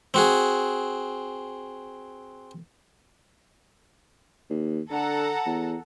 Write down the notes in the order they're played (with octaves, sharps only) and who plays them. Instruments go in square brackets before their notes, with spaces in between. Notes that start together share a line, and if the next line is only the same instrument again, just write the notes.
[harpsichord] C4 F#4 G#4
[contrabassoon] D#2
[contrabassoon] D3 [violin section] A4 F#5 A#5
[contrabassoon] E2